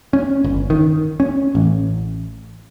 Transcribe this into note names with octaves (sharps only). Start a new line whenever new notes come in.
C#4
G1
D#3
C#4
A1